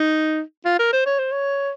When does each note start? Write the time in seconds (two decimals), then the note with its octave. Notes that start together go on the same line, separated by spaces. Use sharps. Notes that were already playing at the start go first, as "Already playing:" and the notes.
Already playing: D#4
0.65 F4
0.79 A#4
0.93 C5
1.06 C#5
1.19 C5
1.32 C#5